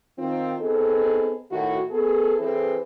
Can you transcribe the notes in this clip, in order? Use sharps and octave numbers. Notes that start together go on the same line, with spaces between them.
D#3 C4 F4
B3 C4 D#4 G#4 A4
A2 D#3 E4 F#4
B3 G#4 A4
E3 C4 E4 G#4 A4 B4